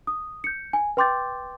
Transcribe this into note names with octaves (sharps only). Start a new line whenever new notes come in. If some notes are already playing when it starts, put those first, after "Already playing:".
D#6
G6 C#7
G#5
B4 G5 C6 D6 G6 A6